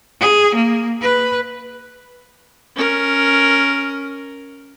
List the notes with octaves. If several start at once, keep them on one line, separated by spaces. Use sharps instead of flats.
G#4
A#3
B4
C#4 A#4